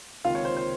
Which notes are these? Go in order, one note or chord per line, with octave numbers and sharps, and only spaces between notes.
C#2 C3 D#3 A#3 F4 F5
C#5
C5
C5